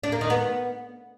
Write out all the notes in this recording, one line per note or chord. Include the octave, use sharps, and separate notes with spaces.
D4
A#3
D#3
B3